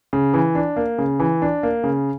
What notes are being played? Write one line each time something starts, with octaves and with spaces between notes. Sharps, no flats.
C#3
E3
D4
A#3
C#3
E3
D4
A#3
C#3